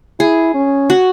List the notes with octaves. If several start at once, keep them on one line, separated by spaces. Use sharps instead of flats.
E4 G#4
C#4
F#4